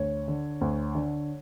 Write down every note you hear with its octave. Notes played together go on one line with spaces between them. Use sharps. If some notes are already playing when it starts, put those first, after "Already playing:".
Already playing: D2 C#5
D3
D2
D3